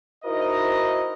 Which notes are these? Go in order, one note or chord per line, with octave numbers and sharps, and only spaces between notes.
D#4 E4 F#4 A#4 C5 D#5